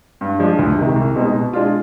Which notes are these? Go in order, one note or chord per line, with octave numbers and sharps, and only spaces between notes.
G2
F3 G#3 D4
D2
C3 D#3 G#3
C2
B2 G#3 C4 D#4
B2
G#3 D4 F4